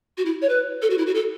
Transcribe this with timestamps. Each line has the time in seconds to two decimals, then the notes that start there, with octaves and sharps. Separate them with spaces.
0.17 F#4
0.25 E4
0.42 C#5
0.49 B4
0.82 A4
0.90 F#4
0.98 E4
1.06 F#4
1.15 A4